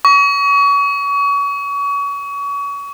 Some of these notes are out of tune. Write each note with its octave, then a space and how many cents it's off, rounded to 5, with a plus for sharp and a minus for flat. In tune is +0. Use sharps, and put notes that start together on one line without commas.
C#6 +35